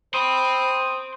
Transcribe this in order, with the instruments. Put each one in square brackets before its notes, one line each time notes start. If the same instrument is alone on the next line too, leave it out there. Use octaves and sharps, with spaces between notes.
[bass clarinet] C5 [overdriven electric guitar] G5 C6 [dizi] B5 [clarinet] D#6